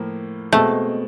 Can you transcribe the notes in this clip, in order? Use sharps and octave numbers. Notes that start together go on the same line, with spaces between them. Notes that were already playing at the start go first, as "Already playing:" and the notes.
Already playing: A2 F3 A#3
B2 G#3 A3 C4